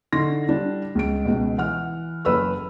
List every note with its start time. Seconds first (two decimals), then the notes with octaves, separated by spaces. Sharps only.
0.13 D3 D#4 C6 A#6
0.49 G3 D4
0.95 C#2 D7
1.25 C#2 B2
1.58 E3 F#5 F6
2.25 F#1 B4 B5 E6 F6